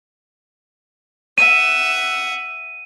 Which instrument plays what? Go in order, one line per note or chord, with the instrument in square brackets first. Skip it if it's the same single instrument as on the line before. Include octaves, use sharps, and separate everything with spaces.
[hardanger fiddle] E5 F#5 [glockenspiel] D#7